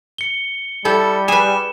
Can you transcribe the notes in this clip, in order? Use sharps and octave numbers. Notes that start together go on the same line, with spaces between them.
C#7 G7
G3 E4 G4 A4
G#4 B4 G#5 E7